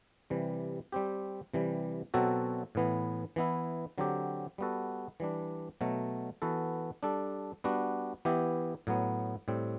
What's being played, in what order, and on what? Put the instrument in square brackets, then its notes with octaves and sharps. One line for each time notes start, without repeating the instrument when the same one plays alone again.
[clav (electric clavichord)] C3 E3 G3
G3 C4 G4
C3 E3 G3
B2 F#3 C4 F#4 A4
A2 E3 B3
E3 B3 E4
D3 F#3 C4 G4
G3 B3 F#4 A4
E3 G3 D4
B2 F#3 A3
E3 B3 F#4 A4
G3 D4 A4
G3 B3 D4 F#4
E3 B3 E4 G4
A2 F#3 B3
A2 G3 C4